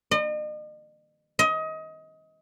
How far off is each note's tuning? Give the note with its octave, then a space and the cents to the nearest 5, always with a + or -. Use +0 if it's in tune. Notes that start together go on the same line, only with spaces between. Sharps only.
D#5 -40
D#5 +25